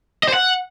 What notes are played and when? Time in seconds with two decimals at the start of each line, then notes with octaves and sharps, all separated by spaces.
0.23 D#5
0.28 C5
0.34 F#5